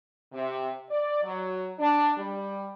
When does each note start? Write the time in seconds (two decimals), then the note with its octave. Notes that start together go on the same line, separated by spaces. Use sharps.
0.33 C3
0.90 D5
1.23 F#3
1.79 D4
2.18 G3